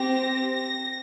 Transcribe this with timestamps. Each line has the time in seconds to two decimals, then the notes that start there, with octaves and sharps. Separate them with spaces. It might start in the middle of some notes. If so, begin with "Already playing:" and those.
Already playing: C4 G4 A#6
0.53 A#6